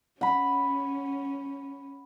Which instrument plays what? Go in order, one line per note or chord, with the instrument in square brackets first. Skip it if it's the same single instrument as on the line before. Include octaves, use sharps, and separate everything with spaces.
[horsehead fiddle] C#4 [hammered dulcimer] F#5 B5